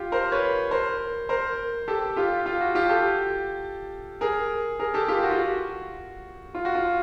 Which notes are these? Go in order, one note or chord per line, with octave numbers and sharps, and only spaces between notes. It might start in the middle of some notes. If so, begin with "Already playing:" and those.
Already playing: F4 G4
A#4 C5
B4 C#5
A#4 C5
A#4 C5
G4 A4
F4 G4
F4
F#4
F4 G4
G4 A4
G#4 A#4
G#4 A#4
G4 A4
F4 G4
F#4
F4
F#4
F4
F#4
F4